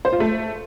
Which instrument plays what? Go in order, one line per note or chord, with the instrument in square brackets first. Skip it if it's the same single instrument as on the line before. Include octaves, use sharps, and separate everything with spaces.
[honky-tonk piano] C5
F4
A3